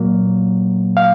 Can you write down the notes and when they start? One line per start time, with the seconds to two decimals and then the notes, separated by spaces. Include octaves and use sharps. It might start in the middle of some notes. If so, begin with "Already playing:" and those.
Already playing: A#2 F#3 A#3
0.97 F5